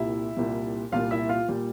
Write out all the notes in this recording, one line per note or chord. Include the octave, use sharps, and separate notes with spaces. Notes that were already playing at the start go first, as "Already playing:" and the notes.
Already playing: C2 A#2 G3 E4 E5
C2 A#2 G3
C2 A#2 G3 F4 F5
E4 E5
F4 F5
A#2 G3